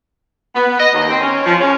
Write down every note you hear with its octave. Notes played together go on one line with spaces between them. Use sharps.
B3
D#5
D#2
C4
C#4
F3
C#4